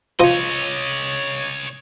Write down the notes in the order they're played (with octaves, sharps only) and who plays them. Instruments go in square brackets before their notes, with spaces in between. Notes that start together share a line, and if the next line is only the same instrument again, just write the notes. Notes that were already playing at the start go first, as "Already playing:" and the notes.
[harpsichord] F3 [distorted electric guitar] C#5 D#5